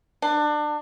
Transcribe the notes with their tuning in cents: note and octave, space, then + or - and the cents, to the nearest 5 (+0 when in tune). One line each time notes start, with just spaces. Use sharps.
D4 +25